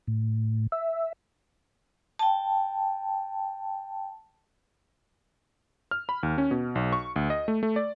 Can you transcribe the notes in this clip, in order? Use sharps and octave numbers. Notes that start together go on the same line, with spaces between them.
A2
E5
G5 A5
F6
B5
D#2
C#4
B2
B1
C#6
D2
D#5
A3
A3
D5